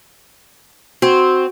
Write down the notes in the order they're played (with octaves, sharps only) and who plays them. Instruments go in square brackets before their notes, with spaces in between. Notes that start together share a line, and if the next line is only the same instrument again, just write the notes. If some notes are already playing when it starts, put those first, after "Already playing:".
[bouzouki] C4 [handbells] F#4